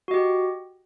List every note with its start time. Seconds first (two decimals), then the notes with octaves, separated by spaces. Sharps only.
0.08 F#4
0.11 D#5
0.14 G4